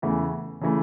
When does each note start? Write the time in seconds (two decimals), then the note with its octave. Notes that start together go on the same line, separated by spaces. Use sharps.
0.02 E2 C#3 E3 A3
0.61 C#3 E3 A3